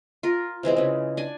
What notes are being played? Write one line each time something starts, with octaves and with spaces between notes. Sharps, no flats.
F4 A#4
C3 E3 G#3 C4
C#3 E3
D4 G#5